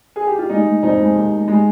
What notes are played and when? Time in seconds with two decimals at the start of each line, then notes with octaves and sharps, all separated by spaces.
0.16 G#4
0.27 G4
0.39 F4
0.49 G#3 D#4
0.66 G#3
0.83 F2 D#4
0.99 G#3
1.15 D#2
1.32 G#3
1.48 G#3